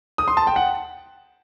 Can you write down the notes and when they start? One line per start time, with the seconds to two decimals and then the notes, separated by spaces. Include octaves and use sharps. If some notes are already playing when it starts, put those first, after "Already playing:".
0.18 D#6
0.28 C6
0.37 A5
0.47 G5
0.56 F#5